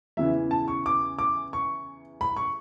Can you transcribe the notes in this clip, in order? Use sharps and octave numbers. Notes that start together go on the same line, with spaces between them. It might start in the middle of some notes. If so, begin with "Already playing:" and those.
E2 C#3 E3 E5
A5
C#6
D6
D6
C#6
B5
C#6